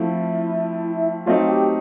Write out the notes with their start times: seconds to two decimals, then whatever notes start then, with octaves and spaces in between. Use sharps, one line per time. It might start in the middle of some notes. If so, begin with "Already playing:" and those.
Already playing: F3 A3 C4 E4 F4
1.26 F#3 A3 C4 D#4 F4
1.49 G4